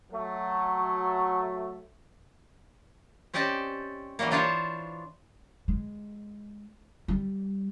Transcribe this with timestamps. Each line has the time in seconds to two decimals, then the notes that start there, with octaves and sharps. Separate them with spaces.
0.12 F#3 A3
3.34 C4 C#4 G4 D5 D#5 A5
4.19 E3 F#3 G3 A#3
4.31 E3 D4 F4 C5 C#5 A5
5.68 G#3
7.08 G3